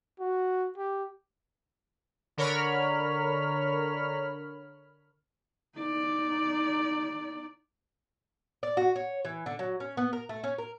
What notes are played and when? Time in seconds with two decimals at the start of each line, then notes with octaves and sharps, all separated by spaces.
0.20 F#4
0.78 G4
2.37 D3 A#4 C#5 B5 F6
5.77 D#4 D5
8.63 D5
8.77 F#4
8.96 C#5
9.25 E3
9.46 D3
9.59 F#3
9.80 C#4
9.97 B3
10.13 A#4
10.29 A3
10.43 C#4
10.58 A#4